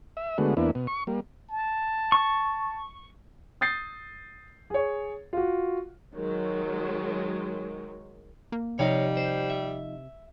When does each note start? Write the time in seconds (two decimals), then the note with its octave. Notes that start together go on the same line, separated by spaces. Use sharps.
0.17 E5
0.38 D3 G#3 A3 B3 F#4
0.57 E2 A#3 B3 D4 E4
0.75 B2
0.87 C#6
1.07 G3 A#3
1.50 A5
2.12 C#6
3.61 D#6 G6 A6 C7
4.70 G#4 C#5
5.33 F4 F#4
6.16 D#3 F#3 G#3
8.52 A#3
8.79 C3 F3 G3 D#4 C#5 D#5 F5
9.17 C5
9.50 E5